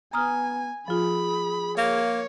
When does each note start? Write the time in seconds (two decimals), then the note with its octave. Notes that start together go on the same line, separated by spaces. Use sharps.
0.13 B3 G#5 A#5 D#6 F6
0.88 F3 F4 G#4 B5
1.78 A#3 C#5